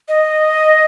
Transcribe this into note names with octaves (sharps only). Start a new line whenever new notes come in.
D#5